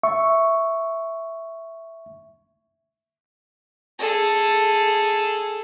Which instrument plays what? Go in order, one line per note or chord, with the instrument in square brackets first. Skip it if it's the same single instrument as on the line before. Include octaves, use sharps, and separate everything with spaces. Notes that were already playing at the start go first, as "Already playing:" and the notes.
[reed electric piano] E5 C#6
[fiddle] G#4 A4